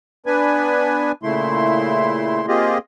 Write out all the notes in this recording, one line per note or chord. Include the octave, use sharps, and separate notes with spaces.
B3 D4 B4 G#5
A#2 C#3 A3 E4 C6
A#3 C4 F4 G4 G#4 D#5